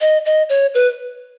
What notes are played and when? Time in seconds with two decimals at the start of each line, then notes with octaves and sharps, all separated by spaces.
0.01 D#5
0.26 D#5
0.49 C#5
0.74 B4